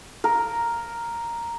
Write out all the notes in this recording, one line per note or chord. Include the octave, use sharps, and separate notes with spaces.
A#4